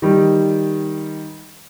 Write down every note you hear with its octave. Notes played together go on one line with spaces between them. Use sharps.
D#3 G3